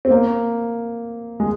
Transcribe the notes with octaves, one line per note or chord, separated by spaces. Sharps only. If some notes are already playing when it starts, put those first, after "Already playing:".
C4
A#3
G#3